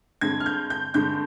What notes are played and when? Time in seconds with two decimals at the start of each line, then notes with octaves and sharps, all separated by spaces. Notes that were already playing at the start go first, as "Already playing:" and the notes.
0.21 G2 D3 G#3 C4 G#6
0.40 F6
0.46 G6
0.70 G6
0.94 G2 D3 G#3 C4 G6